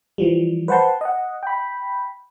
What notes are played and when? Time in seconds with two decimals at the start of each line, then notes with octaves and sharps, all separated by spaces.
0.18 E3 F3 G3
0.68 B4 C5 F#5 G5 A5 C6
1.01 D#5 F#5
1.43 G5 B5